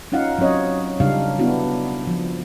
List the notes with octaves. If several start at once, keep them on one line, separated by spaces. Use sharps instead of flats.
C#4 D#4 F4 F5 F#5
F#3 C4 C#4 C#5 D#5
C#3 G3 D4 D#4 F5
B3 D4 E4 F#4
F3